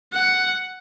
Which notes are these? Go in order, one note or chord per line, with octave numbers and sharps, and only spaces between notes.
F#5